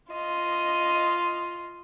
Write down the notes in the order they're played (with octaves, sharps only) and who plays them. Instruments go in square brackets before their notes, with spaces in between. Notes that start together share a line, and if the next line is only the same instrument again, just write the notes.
[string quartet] F4 D#5